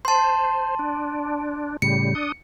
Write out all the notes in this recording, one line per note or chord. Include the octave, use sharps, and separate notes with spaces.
C5 A5 C6
D4
A2 C#3 G3 C#7
D4 D#6